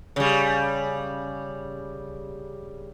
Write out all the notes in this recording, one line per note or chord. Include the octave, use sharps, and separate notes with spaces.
C#3 G3